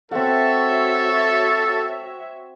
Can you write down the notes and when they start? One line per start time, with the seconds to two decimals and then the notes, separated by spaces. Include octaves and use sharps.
0.11 C4 F#4 A4 C#5 E5 F#5